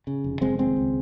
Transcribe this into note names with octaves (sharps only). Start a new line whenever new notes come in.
C#3
F1
F1 G#3 C4
D#2 G#3 C4
C#2